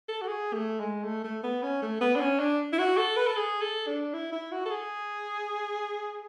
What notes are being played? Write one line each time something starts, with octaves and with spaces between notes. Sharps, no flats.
A4
F#4
G#4
A3
G#3
A3
A3
B3
C#4
A3
B3
D4
C#4
D4
E4
F#4
A4
B4
A4
G#4
A4
D4
E4
E4
F#4
A4
G#4